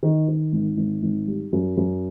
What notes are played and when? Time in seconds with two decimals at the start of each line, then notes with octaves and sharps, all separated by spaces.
0.03 D#3
0.28 D#3
0.53 G#1
0.77 G#1
1.02 G#1
1.27 G3
1.53 F#2
1.77 F#2